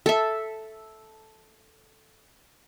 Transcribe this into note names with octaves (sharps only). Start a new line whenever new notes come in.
A4 E5